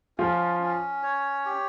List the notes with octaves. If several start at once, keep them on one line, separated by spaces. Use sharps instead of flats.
F3 C#4 F4
C#4
C#5
G4